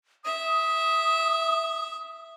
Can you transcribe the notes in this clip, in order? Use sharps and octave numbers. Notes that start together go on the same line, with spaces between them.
E5 D#6